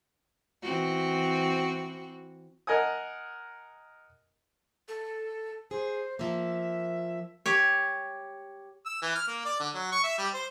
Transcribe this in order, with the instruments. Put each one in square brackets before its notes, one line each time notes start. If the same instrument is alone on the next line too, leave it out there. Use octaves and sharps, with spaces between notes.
[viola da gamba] E3 C4 F#4
[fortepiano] A#4 D#5 F#5 G#5 D#6
[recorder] A4
[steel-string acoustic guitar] G#4 [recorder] C5
[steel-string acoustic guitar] F3 A#3 [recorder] E5
[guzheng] G4 C#5
[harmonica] E6
E3
F6
A#3
D5
D3
F#3
C#6
E5
G3
C5